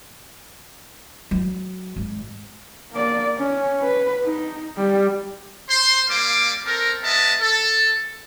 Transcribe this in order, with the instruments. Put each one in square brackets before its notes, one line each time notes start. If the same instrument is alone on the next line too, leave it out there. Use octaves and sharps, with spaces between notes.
[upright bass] F#3
G#1
[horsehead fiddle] A#3 D5
C#4
B4
D#4
G3
[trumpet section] C5 C6
G3 A#3 F5 D6
C4 A4 A#4
G#3 B3 D#5 E5 A5
A4